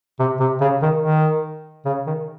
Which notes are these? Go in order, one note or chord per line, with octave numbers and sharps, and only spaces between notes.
C3
C3
C#3
D#3
D#3
C#3
D#3